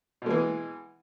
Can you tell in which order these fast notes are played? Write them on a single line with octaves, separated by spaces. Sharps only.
B2 G#3 E3